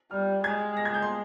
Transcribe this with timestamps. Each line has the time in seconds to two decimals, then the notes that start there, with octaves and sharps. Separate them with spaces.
0.11 G3 F6
0.44 G#3 G#6
0.77 A#6
0.85 G#6
0.94 G6
1.02 C6